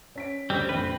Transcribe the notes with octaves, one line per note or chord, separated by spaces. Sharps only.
C#4 B6 D7
D2 C#3 G3 C4
A#1 F2 C4 B4